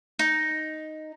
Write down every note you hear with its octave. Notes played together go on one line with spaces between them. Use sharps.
D#4